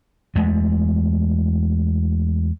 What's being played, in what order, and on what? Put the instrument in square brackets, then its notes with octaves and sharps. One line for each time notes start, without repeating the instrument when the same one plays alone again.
[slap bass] E2 G#3 A3